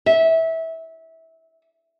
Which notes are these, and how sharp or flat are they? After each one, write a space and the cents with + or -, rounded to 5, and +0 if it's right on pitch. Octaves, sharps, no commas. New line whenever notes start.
E5 -20